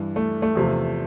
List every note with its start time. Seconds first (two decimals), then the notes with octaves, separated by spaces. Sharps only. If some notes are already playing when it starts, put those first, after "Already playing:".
Already playing: G2 E3
0.16 A3
0.42 A3
0.55 E2 C3 F3